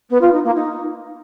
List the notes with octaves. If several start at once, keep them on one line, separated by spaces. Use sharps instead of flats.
B3
F4
D#4
A#3
D#4